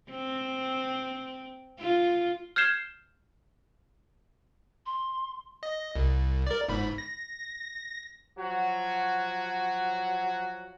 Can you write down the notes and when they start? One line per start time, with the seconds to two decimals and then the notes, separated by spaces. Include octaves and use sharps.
0.11 C4
1.79 F4
2.56 F6 G6 G#6 C7 E7 G7
4.86 C6
5.63 D#5
5.95 C2
6.47 A#4 D5
6.68 G1 G#2 B5
6.98 A#6
8.38 F3 F#3 F#4